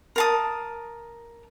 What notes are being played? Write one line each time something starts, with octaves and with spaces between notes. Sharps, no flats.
A#4 A5 D#6